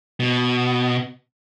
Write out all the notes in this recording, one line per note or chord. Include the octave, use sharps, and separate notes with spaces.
B2